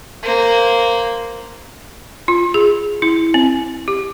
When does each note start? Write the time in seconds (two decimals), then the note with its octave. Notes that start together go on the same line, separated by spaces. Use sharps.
0.23 A#3 C5
2.28 F4
2.54 G#4
3.02 E4
3.34 C4
3.88 G4